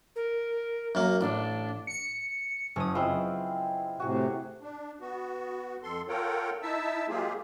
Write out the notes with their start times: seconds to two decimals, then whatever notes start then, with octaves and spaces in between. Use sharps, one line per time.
0.16 A#4
0.95 F#2 A#3
1.21 A1 D4
1.87 C#7
2.76 F#1 C#4 G#4 C#5 D#6
2.95 G#3 B3 C4 E4 F4
4.00 A2 C3 F#4 G#4
4.61 D4
5.01 B3 F#4
5.83 F2 A4 C6
6.09 F4 A4 A#4 C#5 F#5 G5
6.62 D#4 E4 E5 A5 E6
7.09 F#3 G#3 A#3 F4 G4 G#4